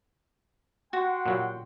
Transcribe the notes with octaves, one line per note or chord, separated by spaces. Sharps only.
F#4 F#5 G5 C6
A#2 F#3 G3